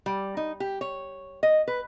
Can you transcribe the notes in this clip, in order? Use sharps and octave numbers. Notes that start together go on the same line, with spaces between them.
G3
D#4
G4
C#5
D#5
B4